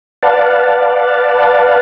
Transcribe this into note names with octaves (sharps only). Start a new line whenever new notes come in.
B4 D5 F5 F#5 A5